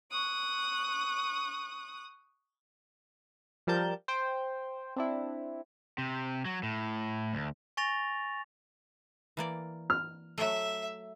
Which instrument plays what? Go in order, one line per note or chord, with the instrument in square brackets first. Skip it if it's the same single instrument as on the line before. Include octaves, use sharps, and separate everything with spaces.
[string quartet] C#6 D#6 F#6
[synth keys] F3 G3 A#4 A5 G6
C5 G5
C4 D4 E4
[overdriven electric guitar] C3
F#3
A2
D2
[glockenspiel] G#5 C#6 A6 A#6 F7
[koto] E3 A#3 D5
[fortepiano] F6
[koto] F#3 A3 [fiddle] E5